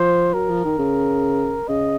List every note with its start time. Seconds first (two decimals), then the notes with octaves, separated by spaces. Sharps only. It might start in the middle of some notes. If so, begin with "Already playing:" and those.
Already playing: F3 C5
0.34 F#3 A#4
0.49 F3
0.65 D#3
0.79 C#3
1.68 C#3 D#5